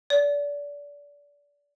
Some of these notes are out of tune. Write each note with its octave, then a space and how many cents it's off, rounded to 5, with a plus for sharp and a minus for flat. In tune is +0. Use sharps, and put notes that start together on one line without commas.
D5 -25